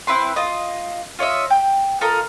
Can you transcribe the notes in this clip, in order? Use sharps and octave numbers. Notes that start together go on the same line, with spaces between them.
C4 E4 B4 C6
F4 D#5
F4 C#5 D#5 E5
G5
F4 A4 A#4 D#5